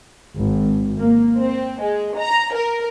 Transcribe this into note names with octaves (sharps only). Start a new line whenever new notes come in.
G#1
A#3
C4
G#3
A#5
A#4